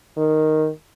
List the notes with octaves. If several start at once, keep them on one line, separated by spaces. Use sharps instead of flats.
D#3